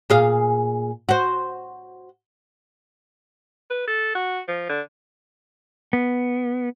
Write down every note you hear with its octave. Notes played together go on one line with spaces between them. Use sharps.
A#2 G#4 F5
F#4 C5
B4
A4
F#4
F3
D3
B3